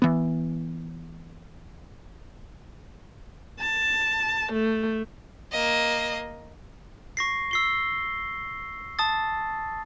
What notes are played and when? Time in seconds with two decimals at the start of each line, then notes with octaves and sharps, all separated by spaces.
0.02 E3 B3
3.59 A5
4.53 A3
5.52 A#3 D#5
7.17 C#6 A#6 C7
7.51 E6 C7 G7
8.99 A5 D#6 A6